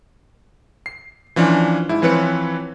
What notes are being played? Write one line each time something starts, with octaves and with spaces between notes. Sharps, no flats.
C7
E3 F3 C#4 D4
G#2 E4
E3 F3 C4 B4 C#5 C#7